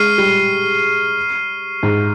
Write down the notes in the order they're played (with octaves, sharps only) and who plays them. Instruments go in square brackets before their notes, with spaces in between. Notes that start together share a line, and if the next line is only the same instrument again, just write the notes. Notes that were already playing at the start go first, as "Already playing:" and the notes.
Already playing: [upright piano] G#3 [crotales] C#6 F6 C7 D#7
[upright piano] G3
G#2